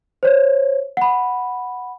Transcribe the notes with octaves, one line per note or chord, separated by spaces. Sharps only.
C5 C#5
F#5 B5